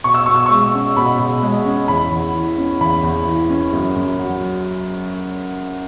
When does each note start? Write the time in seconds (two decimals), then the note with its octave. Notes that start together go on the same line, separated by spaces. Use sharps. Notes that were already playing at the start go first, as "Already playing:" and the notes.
0.04 B2 C#6
0.14 E6
0.26 B2 C#6
0.36 E6
0.46 G#3 C#6
0.74 C#4
0.97 B2 B5
1.19 B2
1.42 G#3
1.66 C#4
1.88 E2 B5
2.12 E2
2.35 E3
2.58 C#4
2.81 E2 B5
3.03 E2
3.27 E3
3.50 C#4
3.73 F#2
3.96 F#2
4.19 F#3